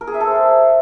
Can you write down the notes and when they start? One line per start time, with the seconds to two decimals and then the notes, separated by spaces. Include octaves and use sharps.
0.01 A#4
0.07 G#4
0.14 E5
0.20 A4
0.27 C5